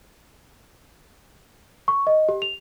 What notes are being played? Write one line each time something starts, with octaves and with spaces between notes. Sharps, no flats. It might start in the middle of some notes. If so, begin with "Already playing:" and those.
C#6
D#5
G4
F7